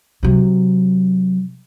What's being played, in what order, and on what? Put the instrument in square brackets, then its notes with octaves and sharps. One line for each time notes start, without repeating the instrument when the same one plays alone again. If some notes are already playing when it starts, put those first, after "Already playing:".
[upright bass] C3 F#3